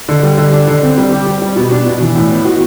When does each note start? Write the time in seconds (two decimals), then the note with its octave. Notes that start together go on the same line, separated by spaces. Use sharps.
0.09 D3
0.23 G3
0.38 D3
0.53 D4
0.67 D3
0.83 C4
0.98 G3
1.13 G4
1.26 G3
1.42 G3
1.56 B2
1.71 D4
1.87 B2
2.01 E3
2.15 A2
2.30 B3
2.45 F#4